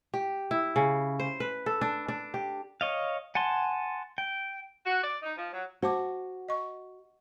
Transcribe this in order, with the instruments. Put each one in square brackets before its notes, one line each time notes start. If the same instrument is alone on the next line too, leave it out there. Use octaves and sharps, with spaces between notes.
[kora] G4
E4
C#3
C5
B4
A4
D4
D4
G4
[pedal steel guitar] C#5 D#5 F5
F#5 G#5 A5 C6
G5
[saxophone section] F#4
D5
D#4
F3
F#3
[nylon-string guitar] F#4 [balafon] C5 A5 D6
[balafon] D#5 C#6